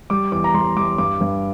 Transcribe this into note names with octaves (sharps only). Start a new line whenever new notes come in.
G3 D6
E2 D6
A#5
G3 C6
G3 D6
G2 D6
G2